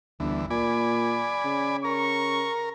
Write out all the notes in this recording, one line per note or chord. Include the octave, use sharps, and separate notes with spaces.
G1 D2 E3
A#2 D5 G#5 B5
C#3
A#4 C#6